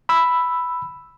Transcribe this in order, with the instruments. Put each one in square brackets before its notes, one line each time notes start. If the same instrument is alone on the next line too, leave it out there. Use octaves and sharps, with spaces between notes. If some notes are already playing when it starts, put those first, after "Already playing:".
[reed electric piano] B5 E6